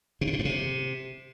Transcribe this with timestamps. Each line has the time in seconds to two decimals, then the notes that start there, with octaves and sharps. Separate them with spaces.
0.21 B2
0.27 C3
0.33 B2
0.39 G2
0.45 C3